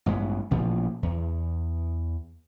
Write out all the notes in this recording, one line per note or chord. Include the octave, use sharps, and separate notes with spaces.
A1 G2 G#3 B3
A1 A#2 F3
E2